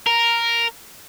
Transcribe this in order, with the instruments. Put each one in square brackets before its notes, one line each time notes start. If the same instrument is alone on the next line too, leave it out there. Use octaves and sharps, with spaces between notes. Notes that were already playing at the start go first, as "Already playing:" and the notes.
[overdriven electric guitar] A#4